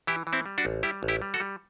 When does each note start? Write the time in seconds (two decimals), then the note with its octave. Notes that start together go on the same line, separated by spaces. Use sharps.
0.07 E3 E4 G4
0.27 E3
0.33 C4 E4
0.46 G3
0.58 D4 F#4
0.65 A1
0.83 G3 E4 G4
1.03 A1
1.08 E4 G4
1.22 G3
1.34 F#4 A4
1.40 G3